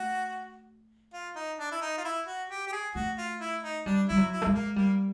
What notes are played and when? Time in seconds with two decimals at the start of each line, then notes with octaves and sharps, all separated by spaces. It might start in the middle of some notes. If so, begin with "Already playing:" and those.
Already playing: A3 F#4
1.13 F4
1.36 D#4
1.59 D4
1.71 E4
1.82 D#4
1.98 F4
2.04 E4
2.27 F#4
2.50 G4
2.67 G4
2.72 G#4
2.95 A3 F#4
3.18 F4
3.40 E4
3.63 D#4
3.86 G3 D4
4.09 G3 E4
4.17 F#3
4.31 E4
4.42 A3
4.46 G#3
4.54 A#3
4.76 G3 A#3